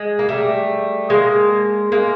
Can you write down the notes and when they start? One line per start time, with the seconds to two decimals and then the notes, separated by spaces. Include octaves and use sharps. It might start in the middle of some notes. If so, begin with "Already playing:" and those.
Already playing: G#3
0.19 A#3
0.29 G3 A3
1.10 G#3 A#3
1.92 G#3 A#3